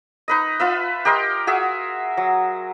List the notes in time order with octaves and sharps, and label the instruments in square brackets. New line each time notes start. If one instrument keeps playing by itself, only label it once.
[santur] D#4 B4 D#5
F4 B4 E5
G4 A#4 D#5 C6
F#4 G#4 E5
F#3